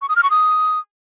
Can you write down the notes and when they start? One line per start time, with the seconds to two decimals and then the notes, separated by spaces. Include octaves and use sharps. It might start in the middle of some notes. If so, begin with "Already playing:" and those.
0.02 C#6
0.09 D#6
0.16 F6
0.23 C#6
0.31 D#6